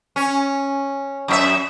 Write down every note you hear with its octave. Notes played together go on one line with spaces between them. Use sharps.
C#4
F#2 E4 E5